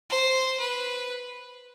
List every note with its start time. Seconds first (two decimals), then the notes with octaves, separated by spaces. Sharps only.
0.09 C5
0.59 B4